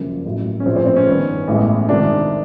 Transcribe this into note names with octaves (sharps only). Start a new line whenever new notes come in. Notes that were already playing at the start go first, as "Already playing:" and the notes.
Already playing: G1 F#2 C#3 F3 A#3
A1 A2 F#3
C#4
A#1 A2 F3 C4
C4
C4
C#4
G2 D#3 G3 B3
A1 A2 E3 G#3 B3
C2 C3 D#3 G#3 D4